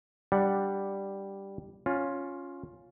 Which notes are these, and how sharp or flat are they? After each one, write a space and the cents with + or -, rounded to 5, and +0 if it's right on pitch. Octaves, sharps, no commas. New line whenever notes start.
G3 +0 D4 +0 F#5 +0
C#4 +0 F4 +10